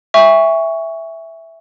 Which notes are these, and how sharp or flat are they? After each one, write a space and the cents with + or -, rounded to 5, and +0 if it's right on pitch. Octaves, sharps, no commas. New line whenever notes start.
E5 +0 G#5 -40 C#6 +10